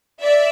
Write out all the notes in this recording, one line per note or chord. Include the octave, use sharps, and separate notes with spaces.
D5 E5